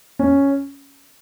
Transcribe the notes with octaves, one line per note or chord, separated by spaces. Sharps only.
C#4